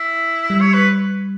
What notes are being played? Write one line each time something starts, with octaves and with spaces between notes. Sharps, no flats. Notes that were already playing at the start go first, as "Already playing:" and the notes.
Already playing: E4
G3
C#5
B4